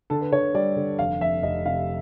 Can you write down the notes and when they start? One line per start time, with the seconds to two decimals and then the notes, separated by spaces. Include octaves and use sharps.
0.10 D3 A4
0.21 B4
0.32 D3 C#5
0.54 G3 D5
0.76 D3
0.99 F1 F5
1.21 F2 E5
1.43 F1 D#5
1.65 C3 F5